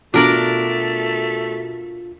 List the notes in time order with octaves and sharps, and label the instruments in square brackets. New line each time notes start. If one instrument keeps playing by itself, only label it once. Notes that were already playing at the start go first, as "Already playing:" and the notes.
[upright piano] B2 [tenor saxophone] A3 [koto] D4 A#4 D5 [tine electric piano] F4